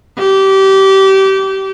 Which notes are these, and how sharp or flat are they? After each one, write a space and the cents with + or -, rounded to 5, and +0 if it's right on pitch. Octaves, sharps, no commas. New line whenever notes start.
G4 -25